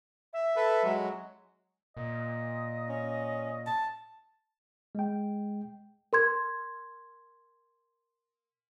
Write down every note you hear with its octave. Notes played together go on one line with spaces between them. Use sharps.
E5
A4 B4
F#3 G#3 F#4
A#2 D#5
C#4
A5
G#3 G5
A#4 C6 G#6